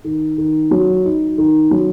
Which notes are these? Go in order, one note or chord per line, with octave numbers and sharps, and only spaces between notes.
D#3
D#3
F#3
D#4
D#3
F#3